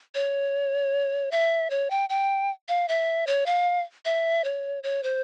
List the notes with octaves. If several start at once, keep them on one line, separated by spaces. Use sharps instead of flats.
C#5
E5
C#5
G5
G5
F5
E5
C#5
F5
E5
C#5
C#5
C5